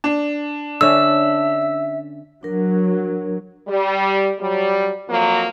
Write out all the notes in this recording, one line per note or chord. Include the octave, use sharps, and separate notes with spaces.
D4
D3 C#4 E5 E6
F#3 D4 A#4
G3
F#3 G3
F2 F3 F#3 A#3